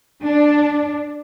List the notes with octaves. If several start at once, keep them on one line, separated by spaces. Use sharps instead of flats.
D4